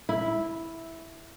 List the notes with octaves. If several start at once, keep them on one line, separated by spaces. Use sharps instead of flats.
E4